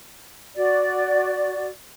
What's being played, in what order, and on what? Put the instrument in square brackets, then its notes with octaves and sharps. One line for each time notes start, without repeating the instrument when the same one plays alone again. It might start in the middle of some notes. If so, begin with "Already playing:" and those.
[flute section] F#4 D5